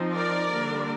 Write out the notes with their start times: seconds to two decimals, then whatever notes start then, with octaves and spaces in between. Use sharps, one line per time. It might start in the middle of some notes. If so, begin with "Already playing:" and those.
Already playing: F3 C4 D#4
0.13 A#4 D5
0.49 D3 G3 A#3 D4